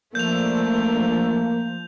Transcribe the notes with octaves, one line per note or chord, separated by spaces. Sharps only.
F3 A3 A#3 D4 G6 F7